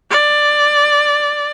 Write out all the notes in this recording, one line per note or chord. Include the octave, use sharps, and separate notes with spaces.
D5